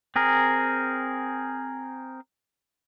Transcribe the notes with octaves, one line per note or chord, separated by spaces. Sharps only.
C4 G#4 A#4